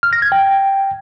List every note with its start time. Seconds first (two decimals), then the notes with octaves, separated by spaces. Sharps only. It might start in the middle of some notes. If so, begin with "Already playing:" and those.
0.03 F6
0.13 A#6
0.22 G#6
0.32 G5